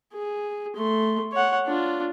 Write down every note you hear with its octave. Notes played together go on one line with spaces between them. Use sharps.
G#4
A3 C6
C#5 F#5
D4 F4